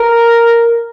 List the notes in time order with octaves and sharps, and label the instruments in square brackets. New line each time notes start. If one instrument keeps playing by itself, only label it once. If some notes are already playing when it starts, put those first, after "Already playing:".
Already playing: [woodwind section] A#4